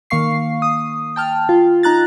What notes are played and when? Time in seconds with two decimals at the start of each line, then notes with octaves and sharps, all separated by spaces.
0.10 D#3 A#3 F5 C#6 C7
0.62 D#6
1.16 G5 A5 F6
1.49 F4
1.83 D#4 A#5 F#6 A6